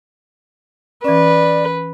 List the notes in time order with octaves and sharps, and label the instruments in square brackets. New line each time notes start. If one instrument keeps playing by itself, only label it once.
[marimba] E3 C#4 [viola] B4 [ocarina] D5